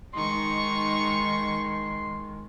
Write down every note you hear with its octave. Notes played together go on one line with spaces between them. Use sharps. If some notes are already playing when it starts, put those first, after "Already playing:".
D#3 G#3 D#4 C6 C#6